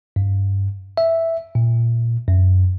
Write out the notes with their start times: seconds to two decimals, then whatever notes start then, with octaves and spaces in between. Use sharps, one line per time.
0.16 G2
0.97 E5
1.55 A#2
2.28 F#2